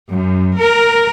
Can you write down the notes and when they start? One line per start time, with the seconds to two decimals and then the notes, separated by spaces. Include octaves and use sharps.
0.11 F#2
0.58 A#4